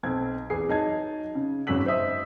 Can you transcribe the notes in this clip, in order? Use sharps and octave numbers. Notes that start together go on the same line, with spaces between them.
B1 C4 G#6
E2 G#4 C7
F#3 D#4 A5 G#6
C#3
G#1 C#3 F#3 E6 B6 F#7
C5 D#5 E5 D#6